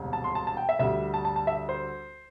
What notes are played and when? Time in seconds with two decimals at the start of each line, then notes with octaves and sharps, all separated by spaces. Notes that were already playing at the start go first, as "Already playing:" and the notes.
Already playing: E1 D2 C3 G3
0.13 A5
0.24 C6
0.35 A5
0.47 A5
0.57 G5
0.69 E5
0.79 D2 D3 G3 E5
1.14 A5
1.25 A5
1.36 A5
1.47 E5
1.69 C5